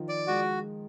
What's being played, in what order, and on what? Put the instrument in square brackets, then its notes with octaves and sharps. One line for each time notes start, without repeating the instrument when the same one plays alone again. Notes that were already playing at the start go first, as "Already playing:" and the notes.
Already playing: [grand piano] D#3 F3
[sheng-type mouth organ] D5
[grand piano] G#3 [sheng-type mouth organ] F#4